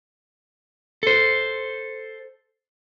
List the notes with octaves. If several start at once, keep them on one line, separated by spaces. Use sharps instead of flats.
A4 C5